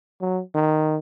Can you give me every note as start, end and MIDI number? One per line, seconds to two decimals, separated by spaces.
0.21 0.41 54
0.54 0.98 51